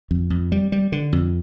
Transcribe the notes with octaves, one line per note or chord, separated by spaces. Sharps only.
F2
F2
G3
G3
D3
F2